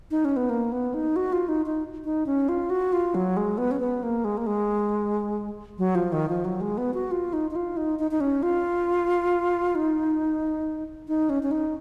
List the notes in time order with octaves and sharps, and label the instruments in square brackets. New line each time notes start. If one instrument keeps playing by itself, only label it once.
[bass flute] D#4
C#4
B3
A#3
B3
D#4
F#4
F4
D#4
D#4
D#4
C#4
F4
F#4
F4
F#3
G#3
B3
C#4
B3
A#3
G#3
A#3
G#3
F#3
F3
D#3
F3
F#3
G#3
B3
F#4
F4
D#4
D#4
F4
D#4
D#4
D#4
C#4
F4
D#4
D#4
C#4
C#4
D#4